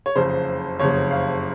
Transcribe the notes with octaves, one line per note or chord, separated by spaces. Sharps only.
C#5
F#1 F2 C#3 C5
F#1 F2 C#3 C#5
F5